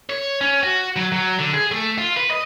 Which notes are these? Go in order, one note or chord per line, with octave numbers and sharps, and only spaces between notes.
C#5
C#4
F#4
F#3
F#3
D3
G#4
A3
F4
B4
D#5